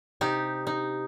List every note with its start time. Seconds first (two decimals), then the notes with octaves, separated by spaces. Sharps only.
0.21 C3 D#4 G4
0.67 D#4